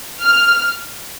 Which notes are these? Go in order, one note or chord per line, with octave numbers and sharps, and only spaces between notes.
F6